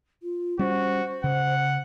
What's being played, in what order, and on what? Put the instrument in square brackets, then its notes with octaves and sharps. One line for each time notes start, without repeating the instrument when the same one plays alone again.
[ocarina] F4
[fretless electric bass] G3 C#4 [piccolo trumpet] F#4 [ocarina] C5
[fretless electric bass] C#3 [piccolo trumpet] F#5